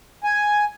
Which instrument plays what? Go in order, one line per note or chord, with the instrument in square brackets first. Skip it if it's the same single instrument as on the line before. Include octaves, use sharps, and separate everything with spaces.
[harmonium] G#5